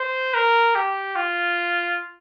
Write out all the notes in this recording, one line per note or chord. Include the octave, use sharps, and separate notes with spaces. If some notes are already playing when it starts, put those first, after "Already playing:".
Already playing: C5
A#4
G4
F4